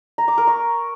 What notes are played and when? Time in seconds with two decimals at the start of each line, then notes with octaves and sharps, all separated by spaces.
0.18 A#5
0.28 D6
0.38 A#4
0.47 C#6